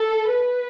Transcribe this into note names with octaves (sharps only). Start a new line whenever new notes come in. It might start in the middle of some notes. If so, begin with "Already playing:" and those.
Already playing: A4
B4